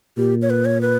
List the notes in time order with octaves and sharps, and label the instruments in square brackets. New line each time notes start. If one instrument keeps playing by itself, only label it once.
[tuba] A#2 [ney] G4
[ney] C#5
B4
C#5
B4